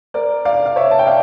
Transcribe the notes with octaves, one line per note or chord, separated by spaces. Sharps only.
A#4 D5
D5 F5
F5
C#5 E5
A5
G5
D5 F5